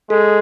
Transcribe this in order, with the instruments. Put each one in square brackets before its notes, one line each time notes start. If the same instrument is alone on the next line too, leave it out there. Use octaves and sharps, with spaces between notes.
[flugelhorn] G#3 [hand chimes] A4